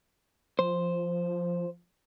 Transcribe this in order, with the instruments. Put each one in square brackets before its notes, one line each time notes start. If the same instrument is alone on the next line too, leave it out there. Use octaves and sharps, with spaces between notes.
[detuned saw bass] F3 [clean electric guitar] C5